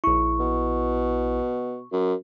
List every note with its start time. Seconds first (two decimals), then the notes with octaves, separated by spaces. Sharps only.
0.04 A#1 E4 C#6
0.39 B2
1.92 F#2